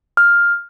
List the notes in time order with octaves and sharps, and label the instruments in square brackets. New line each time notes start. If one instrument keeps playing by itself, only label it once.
[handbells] F6